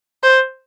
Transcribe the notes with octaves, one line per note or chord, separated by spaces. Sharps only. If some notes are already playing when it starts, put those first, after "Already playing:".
C5